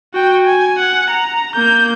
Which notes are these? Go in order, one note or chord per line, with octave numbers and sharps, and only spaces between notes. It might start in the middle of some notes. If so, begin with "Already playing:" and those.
F#4 G5
G#5
F#5
A#5
A#3 G6